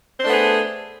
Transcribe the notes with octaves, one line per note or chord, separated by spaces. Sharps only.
A3 B3 D4 G#4 C5